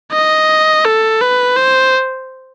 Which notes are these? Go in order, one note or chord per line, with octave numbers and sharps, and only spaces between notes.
D#5
A4
B4
C5